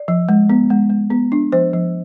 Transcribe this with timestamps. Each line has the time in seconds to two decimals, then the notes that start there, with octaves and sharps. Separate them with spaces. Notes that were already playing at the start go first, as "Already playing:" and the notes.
Already playing: D5
0.08 F3
0.29 G#3
0.50 B3
0.70 G#3
0.90 G#3
1.10 B3
1.32 D4
1.52 F3 C5
1.73 F3